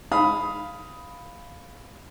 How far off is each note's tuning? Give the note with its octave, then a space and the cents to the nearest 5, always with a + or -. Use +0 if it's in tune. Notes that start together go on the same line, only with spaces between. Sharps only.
F5 +0 B5 +0 D#6 +10